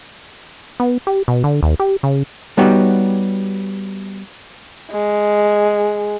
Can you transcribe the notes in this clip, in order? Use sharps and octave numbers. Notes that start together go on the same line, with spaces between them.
B3
G4
B2
D3
D#2
G4
C#3
G3 B3 D#4 F#4 G4 C#5
G#3